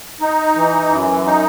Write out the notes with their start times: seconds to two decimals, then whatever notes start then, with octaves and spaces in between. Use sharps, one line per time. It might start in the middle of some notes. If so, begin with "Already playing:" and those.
0.21 D#4
0.56 E3
0.90 F#2
1.26 D#4